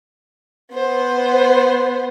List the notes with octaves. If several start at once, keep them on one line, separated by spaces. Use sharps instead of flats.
B3 C5